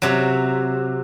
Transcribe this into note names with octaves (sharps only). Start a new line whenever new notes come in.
C3 F#3